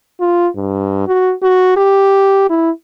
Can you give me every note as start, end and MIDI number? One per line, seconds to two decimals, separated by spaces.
0.20 0.48 65
0.56 1.03 43
1.07 1.33 66
1.42 1.76 66
1.77 2.45 67
2.50 2.70 64